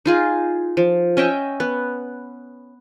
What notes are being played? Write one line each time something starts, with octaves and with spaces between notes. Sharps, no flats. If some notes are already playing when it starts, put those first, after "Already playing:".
D#4 F4 G#4
F3
C#4 D#5 E5 G5
B3